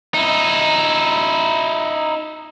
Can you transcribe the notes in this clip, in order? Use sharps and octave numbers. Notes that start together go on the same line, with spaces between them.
D#4 E4